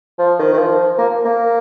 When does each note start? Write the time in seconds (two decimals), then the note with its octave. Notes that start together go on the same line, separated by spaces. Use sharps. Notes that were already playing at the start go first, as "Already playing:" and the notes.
0.19 F3
0.39 D#3
0.53 D#3
0.59 F3
0.98 A#3
1.25 A#3